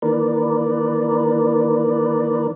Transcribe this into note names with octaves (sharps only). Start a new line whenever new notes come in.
D#3 E3 A#3 A#4 B4 D5